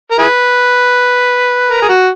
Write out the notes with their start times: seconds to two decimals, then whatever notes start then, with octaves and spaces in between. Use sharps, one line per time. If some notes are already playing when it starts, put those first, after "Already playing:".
0.11 A#4
0.18 E4 G#4 B4
1.70 A#4
1.82 G#4
1.88 F#4